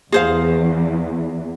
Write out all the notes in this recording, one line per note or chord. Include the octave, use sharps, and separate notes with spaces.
E2 G#4 C5 F5